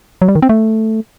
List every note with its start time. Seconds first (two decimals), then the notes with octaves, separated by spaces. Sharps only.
0.22 F#3
0.29 G3
0.35 D#3
0.42 C4
0.49 A3